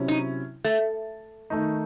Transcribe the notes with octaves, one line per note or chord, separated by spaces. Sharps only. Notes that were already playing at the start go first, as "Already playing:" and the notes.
Already playing: C3 F#3 C#4 E4
D#4
A3
D#3 A3 D#4